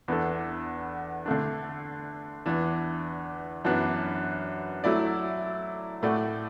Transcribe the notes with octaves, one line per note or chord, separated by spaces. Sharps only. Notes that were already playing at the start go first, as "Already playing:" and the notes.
E2 E3 B3 D4 A4
D3 A3 D4
E2 E3 D4
F#2 E3 B3 D4 B4
F#3 A3 E4 D5
A2 A3 F#4 D5